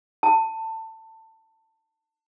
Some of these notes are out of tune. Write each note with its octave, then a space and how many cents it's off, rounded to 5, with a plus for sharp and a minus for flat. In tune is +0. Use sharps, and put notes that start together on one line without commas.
A5 +20